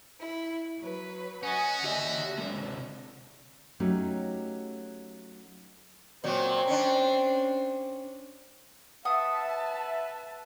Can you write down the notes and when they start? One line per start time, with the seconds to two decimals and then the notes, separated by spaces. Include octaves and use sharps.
0.20 E4
0.79 F#3 B4
1.43 C#4 F#4 D#5 F#5 G#5
1.84 D3 G4 D#5 E5
2.38 C3 G#3
3.80 F#3 A3 C#4 D#4 G4
6.24 A#2 F#3 C4
6.67 C#4 D4
9.05 B4 E5 F#5 A5 D#6